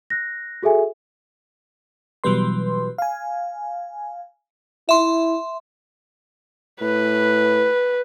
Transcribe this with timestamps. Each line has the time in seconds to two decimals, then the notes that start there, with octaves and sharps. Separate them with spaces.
0.10 F#6 A#6
0.63 F#4 G#4 A4 E5 G#5
2.24 B2 E3 F#3 G3 B4 C6
2.98 F5 G#5
4.89 E4 E5 C6
6.81 A2 B4